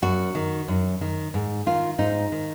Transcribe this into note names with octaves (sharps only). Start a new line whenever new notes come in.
F#2 F#4
D#3
F#2
D#3
G#2
D#3 F4
G#2 D#4
D#3